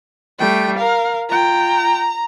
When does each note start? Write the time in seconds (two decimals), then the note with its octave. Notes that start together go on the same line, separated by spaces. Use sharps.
0.39 G3 A3 G5
0.78 A#4 F5
1.30 F4 G5 A#5